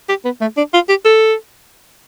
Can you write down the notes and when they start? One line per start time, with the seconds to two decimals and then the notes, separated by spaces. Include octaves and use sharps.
0.09 G4
0.25 B3
0.41 A3
0.57 D4
0.74 F4
0.89 G4
1.05 A4